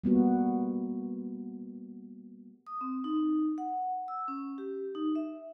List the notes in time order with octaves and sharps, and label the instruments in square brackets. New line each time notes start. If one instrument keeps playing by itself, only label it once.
[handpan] G3 A#3 B3 F#4
[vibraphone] D#6
C4
D#4
F#5
E6
C#4
G4
D#4
E5